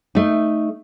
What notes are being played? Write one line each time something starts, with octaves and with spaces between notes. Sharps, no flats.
A3 D#4